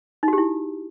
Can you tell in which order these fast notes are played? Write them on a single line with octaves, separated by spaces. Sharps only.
D#4 F#4 G4 E4